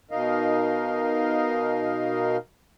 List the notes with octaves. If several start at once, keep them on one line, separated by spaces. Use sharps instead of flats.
B2 D#4 A#4 D#5 F5